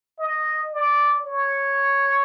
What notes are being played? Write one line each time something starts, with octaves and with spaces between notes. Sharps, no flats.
D#5
D5
C#5